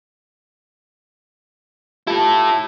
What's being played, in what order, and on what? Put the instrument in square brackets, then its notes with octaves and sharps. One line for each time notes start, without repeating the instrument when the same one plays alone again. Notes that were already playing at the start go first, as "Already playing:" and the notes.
[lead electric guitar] E4 A4 [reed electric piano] F4 G4 A5